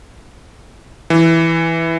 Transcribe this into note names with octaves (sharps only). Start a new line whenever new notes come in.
E3